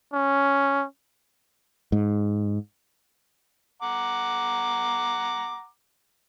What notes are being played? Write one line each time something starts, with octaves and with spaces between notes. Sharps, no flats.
C#4
G#2
F#5 A#5 D6